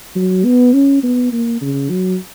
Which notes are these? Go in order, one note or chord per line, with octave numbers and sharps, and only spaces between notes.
F#3
B3
C#4
B3
A#3
C#3
F#3